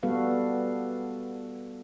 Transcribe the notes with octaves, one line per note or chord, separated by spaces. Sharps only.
G3 B3 F#4 A4 B4 F5